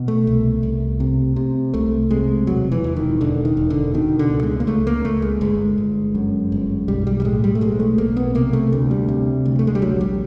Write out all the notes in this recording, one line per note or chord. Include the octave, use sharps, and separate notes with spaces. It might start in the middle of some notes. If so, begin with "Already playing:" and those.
Already playing: B2
A3
C2
C2
C3
C3
C2 A3
C3 G#3
E1 F#3
E3
E1
D#3
E1 D3
D#3
E1
D3
B2 D#3
D3
C#2
G#3
A#3
C#2 A3
A#3
C#2 A3
G#3
G1 G#3
G1
F#2
G1
B1 G3
G3
G3
A2 G#3
G3
A3
B1 G#3
A3
B1 A#3
B3
C3 A#3
A3
D2
G3
C3
D2
A3
G#3
G3
A#1 F#3
G3